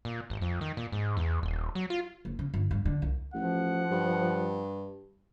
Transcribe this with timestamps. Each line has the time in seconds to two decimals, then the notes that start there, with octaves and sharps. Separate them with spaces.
0.05 A#2
0.30 G#1
0.41 F2
0.61 D#3
0.77 A#2
0.92 G#2
1.17 E2
1.43 D#1
1.75 F#3
1.90 F4
2.25 F#1
2.39 C#3
2.54 G1
2.71 G2
2.86 D3
3.02 C2
3.34 A1 F3 F#5
3.91 G2